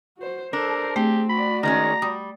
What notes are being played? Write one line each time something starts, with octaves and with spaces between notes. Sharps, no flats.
F#4 C5
D4 A4 A#4 C5
A3 C4 G4 G#4
F#4 D5 B5
D#3 G#3 C#4 A#5 D#6
G3 D#6